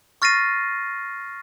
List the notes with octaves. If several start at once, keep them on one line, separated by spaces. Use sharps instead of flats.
C#6 F6 A6 A#6 C7 D#7